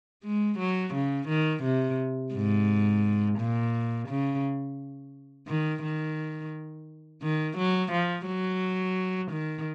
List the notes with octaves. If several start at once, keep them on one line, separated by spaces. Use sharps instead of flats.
G#3
F#3
C#3
D#3
C3
G#2
A#2
C#3
D#3
D#3
D#3
F#3
F3
F#3
D#3